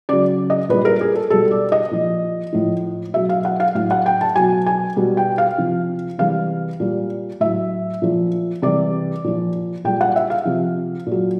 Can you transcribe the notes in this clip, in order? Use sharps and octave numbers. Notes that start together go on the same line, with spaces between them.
C#3 F#3 D5
D#5
A#2 G3 B4
A#4
G#4
A4
B2 G3 A4
D5
D#5
A#2 F3
A2 F3
B2 F#3 E5
F5
F#5
F5
A2 F#3 F5
F#5
G5
A5
B2 F#3 G#5
G#5
B2 G3
G5
F5
C3 F3
C3 E3 G3 F5
A#2 G3
A2 F#3 E5
A#2 F3
C3 E3 G3 D5
A#2 F3
A#2 G3 G5
F#5
E5
F5
C3 F3
A#2
F#3